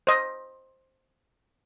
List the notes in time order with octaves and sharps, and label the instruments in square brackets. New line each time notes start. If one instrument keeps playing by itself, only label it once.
[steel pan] C5 D#5